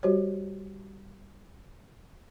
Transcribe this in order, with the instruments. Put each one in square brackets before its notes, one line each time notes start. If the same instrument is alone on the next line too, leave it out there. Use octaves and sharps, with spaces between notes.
[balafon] G3 F#4 G4 C5 C#5